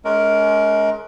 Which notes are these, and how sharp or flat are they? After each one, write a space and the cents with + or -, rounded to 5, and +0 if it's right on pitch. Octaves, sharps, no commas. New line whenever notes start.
G#3 +40 C#4 +40 A#4 +0